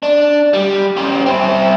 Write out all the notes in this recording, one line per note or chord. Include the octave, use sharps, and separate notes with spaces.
D4
G3
C#4 G4
C4 E4